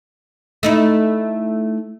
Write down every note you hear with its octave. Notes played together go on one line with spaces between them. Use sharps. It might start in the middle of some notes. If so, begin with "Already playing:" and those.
A3 D#4 E4